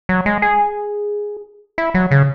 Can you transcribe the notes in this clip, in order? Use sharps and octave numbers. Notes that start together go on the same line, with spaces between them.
F#3
G#3
G#4
E4
F#3
C#3